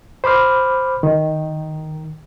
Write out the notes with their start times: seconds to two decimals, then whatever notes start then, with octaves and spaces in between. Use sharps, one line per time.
0.24 C5 B5 D6 F6
1.03 D#3